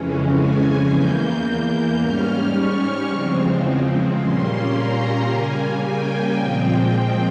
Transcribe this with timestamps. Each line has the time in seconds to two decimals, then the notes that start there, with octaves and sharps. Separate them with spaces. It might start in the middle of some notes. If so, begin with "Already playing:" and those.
Already playing: F2 C#3 E3 G#3 C#4
0.35 G#5
0.90 E2 E3 A#3 G6
1.99 G#2 G3 C#4 F6
2.54 C#6
3.08 E2 C#3 F3 G#3 C4
4.17 A#2 G3 A#3 C#4 C6
4.72 A#5
5.26 C#3 G3 A#3 G#5
5.81 G5
6.34 A#2 F3 G#3 C4